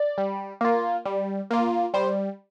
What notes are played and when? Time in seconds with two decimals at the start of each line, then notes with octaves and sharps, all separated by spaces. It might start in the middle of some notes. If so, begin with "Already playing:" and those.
Already playing: D5
0.18 G3
0.61 A#3 F4
1.05 G3
1.51 A#3 F4
1.94 G3 C5